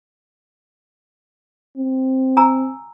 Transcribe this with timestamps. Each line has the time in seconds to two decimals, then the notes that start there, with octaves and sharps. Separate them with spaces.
1.78 C4
2.37 G#5 A#5 E6